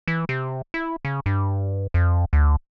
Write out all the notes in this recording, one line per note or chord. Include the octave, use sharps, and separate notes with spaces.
E3
C3
E4
C#3
G2
F2
D2